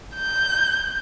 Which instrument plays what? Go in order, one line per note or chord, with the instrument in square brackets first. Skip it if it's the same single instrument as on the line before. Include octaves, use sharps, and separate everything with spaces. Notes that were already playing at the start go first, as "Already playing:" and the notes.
[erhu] G6